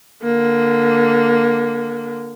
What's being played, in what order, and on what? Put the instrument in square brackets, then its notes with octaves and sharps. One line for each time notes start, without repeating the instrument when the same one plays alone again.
[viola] D3 A#3